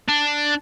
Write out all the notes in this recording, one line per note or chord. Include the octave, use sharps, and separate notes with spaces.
D4